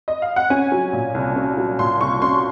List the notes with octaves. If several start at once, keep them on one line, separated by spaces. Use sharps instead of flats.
D#5
F5
F#5
C#4 G#5
F#3
A#2
C2
C#4
F#3
A#2 C6
C2 C#6
C#4 C6